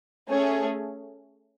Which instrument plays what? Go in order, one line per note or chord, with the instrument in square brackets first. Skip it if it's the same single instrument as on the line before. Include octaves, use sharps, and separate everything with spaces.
[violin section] A3 C#4 G#4 C#5